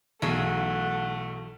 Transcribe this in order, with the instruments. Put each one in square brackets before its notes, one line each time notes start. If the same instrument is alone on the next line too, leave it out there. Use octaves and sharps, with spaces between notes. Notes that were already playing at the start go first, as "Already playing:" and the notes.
[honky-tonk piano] B1 [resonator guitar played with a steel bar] E3 F#3 G#4 [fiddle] A3 [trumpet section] F#5 A5